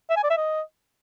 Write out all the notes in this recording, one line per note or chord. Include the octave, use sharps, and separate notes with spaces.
E5
G#5
D5
E5
D#5